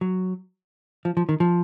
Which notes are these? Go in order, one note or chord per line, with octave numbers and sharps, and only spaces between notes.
F#3
F3
F3
D#3
F3